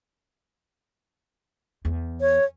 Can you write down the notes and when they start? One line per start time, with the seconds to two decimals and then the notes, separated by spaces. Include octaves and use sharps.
1.85 E2
2.21 C#5